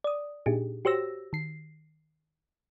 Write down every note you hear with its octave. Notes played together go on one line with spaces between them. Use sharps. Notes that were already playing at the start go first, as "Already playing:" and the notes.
D5 D#6
A#2 D4 D#4 G4 G#4
F#4 G4 C5 C#5 E6 A#6
D#3 C7